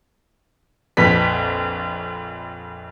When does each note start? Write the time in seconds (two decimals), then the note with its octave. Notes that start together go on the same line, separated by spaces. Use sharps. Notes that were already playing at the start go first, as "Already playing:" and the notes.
0.97 A#1 F2 B4 B6